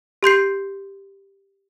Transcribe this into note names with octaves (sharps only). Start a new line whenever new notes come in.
G4 C6 G6 C7